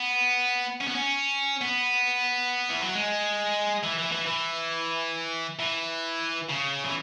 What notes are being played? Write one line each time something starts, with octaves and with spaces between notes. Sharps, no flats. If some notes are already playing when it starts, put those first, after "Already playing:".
Already playing: B3
C#4
B3
C#4
B3
E3
F#3
G#3
E3
E3
E3
E3
E3
C#3
E3